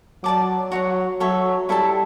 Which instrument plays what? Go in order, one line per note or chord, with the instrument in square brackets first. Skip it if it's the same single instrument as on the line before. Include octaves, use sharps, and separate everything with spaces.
[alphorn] F#3 [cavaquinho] D5 A5 D6
[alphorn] F#3 [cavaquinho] F#4 C#5 F#5
[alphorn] F#3 [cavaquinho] A4 C#5 E5
[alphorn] G3 [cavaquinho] E4 A4 E5 A5